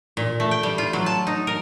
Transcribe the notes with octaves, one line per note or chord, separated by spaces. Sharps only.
A#2
A3
G5
G3
F4
F#3
A5
D#4
A#4